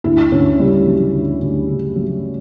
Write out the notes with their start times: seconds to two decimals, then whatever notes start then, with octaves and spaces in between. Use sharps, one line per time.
0.04 D2 E4
0.32 D2 C#4
0.59 C#3 G3
0.86 F#3
1.14 D2
1.42 D2
1.69 C#3
1.96 F#3